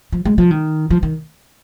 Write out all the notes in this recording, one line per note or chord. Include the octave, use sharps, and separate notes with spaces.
F3
G#3
F3
D#3
F3
D#3